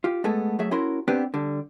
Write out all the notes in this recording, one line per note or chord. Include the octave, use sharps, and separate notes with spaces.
F4 G4
G#3 A3 B3 G#4 A4
F#3 A3 G#4 E5
C#4 E4 F#4 A#4 C6
B3 C4 D4 G4 B4 C5
D3 G3